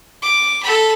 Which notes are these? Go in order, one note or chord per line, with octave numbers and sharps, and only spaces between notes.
D6
A4 B5